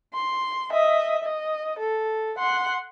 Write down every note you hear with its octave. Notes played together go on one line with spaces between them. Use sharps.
C6
D#5 E5
D#5
A4
F#5 C6